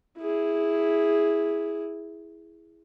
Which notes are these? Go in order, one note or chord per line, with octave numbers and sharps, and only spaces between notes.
E4 G#4